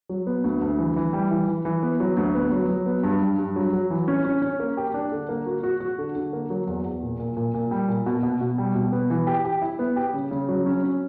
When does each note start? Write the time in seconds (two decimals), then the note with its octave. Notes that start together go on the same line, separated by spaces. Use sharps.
0.09 F#3
0.27 B3
0.44 D2
0.62 D2
0.78 E3
0.96 E3
1.13 G3
1.31 E3
1.48 E3
1.65 E3
1.83 B3
2.00 F#3
2.17 D2
2.35 B3
2.52 F#3
2.69 F#3
2.86 B3
3.03 G2
3.21 G2
3.38 G2
3.56 F#3
3.73 F#3
3.90 E3
4.08 C#4
4.25 C#4
4.42 C#4
4.60 A#3
4.77 G4
4.94 D4
5.12 D3
5.29 A#3
5.46 F#4
5.63 F#4
5.80 F#4
5.98 D3
6.16 D3
6.33 A#3
6.50 F#3
6.67 E2
6.85 E2
7.03 A#2
7.19 A#2
7.37 A#2
7.54 A#2
7.71 G3
7.88 A#2
8.06 B2
8.23 B2
8.41 B2
8.58 G3
8.75 B2
8.92 B3
9.10 E3
9.27 G4
9.45 G4
9.62 E4
9.79 B3
9.96 G4
10.14 C#3
10.31 C#3
10.49 F#3
10.66 C#4
10.83 C#4